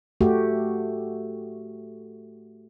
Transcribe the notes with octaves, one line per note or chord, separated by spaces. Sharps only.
A3 F#4 G4